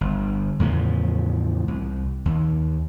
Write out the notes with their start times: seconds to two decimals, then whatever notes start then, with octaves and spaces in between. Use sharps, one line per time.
0.01 G1
0.60 E2 A2 C#3 F3
1.68 C2
2.25 D#2